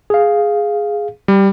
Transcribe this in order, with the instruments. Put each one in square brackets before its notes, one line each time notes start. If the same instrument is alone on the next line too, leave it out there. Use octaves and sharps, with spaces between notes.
[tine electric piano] G#4 F5
[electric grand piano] G3